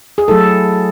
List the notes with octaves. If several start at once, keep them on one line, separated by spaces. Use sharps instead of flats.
G#4
F#3 A3 E4 A4